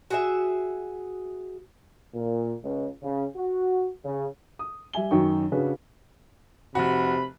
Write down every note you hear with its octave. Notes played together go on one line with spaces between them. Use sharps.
F#4 G#4 E5
A#2
C#2
C#3
F#4
C#3
D#6
G3 E5 G#5 G7
F#2 D#3 F#3 D#4 G5 C#6
C#3 C#4 D4 F#4 G#4 B4
F1 C3 F#4 B5